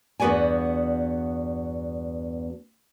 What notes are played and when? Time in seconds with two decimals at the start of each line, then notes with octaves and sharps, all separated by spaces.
0.20 E2 G2 B3 F#4 D5 G#5